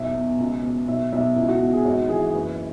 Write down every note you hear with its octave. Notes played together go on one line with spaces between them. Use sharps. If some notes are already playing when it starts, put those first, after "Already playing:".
Already playing: B1 E2 E5
B2
C#2
B2
B1 E5
B1 E5
C#2 E4
F#4
B2 F#4
G#4
G#1 F#4
E3 G#4
F#1 B4